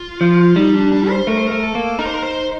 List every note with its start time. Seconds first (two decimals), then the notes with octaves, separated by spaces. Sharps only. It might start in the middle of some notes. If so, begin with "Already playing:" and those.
Already playing: F4
0.21 F3
0.56 G3 D#4
0.74 D4
0.92 D4
1.09 C5
1.27 A3 A#4
1.37 C5
1.47 A3 A#4
1.63 A4
1.75 A#3
1.99 D#4 A#4
2.06 C5
2.14 A#4
2.22 C5